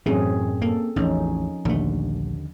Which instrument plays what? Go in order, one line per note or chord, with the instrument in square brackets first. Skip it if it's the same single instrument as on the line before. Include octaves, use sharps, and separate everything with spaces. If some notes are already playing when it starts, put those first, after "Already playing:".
[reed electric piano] F#2 A2 [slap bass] E3 [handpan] C4 C#4 G#4
[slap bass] A#3 [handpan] A4
[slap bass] A1 [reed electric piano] E2 [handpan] F3 C#4 D#4
[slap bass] A#1 A3 [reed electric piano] D#2 D3